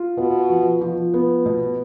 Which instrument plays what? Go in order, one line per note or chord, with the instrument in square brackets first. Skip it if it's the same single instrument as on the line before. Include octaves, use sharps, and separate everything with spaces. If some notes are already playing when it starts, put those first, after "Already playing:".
Already playing: [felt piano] F4
[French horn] B2 [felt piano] B3
[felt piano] F3
F3
B3
B2